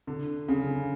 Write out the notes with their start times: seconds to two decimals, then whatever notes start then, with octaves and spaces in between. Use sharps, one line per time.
0.07 D3
0.48 C#3